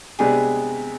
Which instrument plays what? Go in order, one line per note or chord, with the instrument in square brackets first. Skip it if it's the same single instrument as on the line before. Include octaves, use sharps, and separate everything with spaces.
[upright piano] C3 G#3 B3 D4 [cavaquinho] G#4